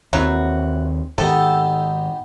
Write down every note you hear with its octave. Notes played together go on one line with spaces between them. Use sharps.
D#2 D#3 E3 F#3 C4 F#4
G#2 D#3 B3 D#4 G4 A4